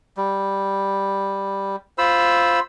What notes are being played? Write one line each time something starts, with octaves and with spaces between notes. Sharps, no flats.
G3
F4 C5 B5 E6